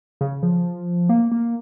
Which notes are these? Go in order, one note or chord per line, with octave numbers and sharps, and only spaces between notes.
C#3
F3
A#3
A#3